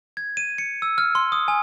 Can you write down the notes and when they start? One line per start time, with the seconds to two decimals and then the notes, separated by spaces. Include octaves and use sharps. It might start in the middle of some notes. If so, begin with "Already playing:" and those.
0.17 G#6
0.37 D#7
0.58 C#7
0.82 E6
0.98 F6
1.15 C6
1.32 D#6
1.48 G#5